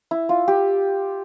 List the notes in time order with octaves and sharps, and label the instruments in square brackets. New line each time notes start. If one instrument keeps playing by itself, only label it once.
[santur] E4
F4
G4